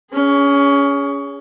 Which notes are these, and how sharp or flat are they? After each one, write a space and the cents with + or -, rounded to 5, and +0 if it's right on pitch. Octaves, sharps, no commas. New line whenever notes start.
C#4 +20 G#4 -10